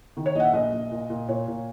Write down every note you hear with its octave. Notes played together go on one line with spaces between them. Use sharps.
D#3
C#5
A#1 D#5 F#5
E5
A#1 D#5
A#1
A#2
A#2
A#2 C#5
A#2